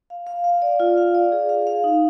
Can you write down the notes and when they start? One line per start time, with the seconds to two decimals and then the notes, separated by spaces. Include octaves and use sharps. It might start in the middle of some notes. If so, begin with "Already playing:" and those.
0.10 F5
0.27 F5
0.44 F5
0.62 D5
0.80 F4
0.97 F5
1.15 D5
1.32 G#4
1.49 F5
1.67 F5
1.84 D#4